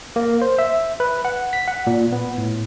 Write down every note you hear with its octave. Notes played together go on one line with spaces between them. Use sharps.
A#3
C5
E5
B4
F#5
B6
F#5
A#2
B3
A2